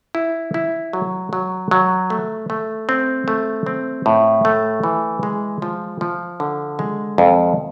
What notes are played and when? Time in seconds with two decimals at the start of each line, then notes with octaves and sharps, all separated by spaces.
0.15 E4
0.54 E4
0.93 F#3
1.33 F#3
1.71 F#3
2.10 A3
2.50 A3
2.89 C4
3.28 A3
3.66 C4
4.06 A2
4.45 A3
4.84 E3
5.23 G#3
5.62 F3
6.01 F3
6.40 D3
6.79 G#3
7.18 F2